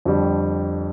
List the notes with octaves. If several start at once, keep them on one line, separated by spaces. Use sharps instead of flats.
F2 D3 G3